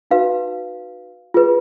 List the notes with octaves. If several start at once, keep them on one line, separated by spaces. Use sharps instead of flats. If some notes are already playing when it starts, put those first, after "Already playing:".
D#4 F#4 B4 F5
F4 G#4 B4